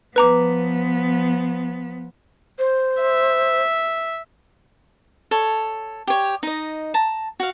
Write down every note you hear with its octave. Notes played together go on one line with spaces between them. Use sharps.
F3 B3 B4 A#5 D6
C5
E5
A4 C#5
G4 C#5
D#4 D#5
A5 A#5
F#4 F5